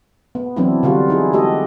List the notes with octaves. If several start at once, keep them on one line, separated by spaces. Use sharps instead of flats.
B3
E3 F#3 B3 C4 D4 E4
D3 G3 F4 F#4
D#4 E4 G#4
G#3 F#4 G4 A4 D#5